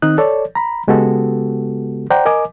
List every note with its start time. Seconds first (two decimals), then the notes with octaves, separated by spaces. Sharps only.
0.02 D#3 C4 D#4 D#6 F#6
0.18 A4 C#5 D5
0.55 A#5 B5
0.88 C#3 G#3 B3 F#4 G4 A4
2.10 C5 D5 F#5 G5 A#5
2.25 A#4 D#5 G#5 D6